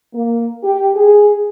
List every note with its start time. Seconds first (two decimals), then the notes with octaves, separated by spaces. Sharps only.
0.14 A#3
0.63 G4
0.95 G#4